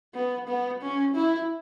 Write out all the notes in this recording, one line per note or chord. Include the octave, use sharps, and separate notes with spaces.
B3
B3
C#4
E4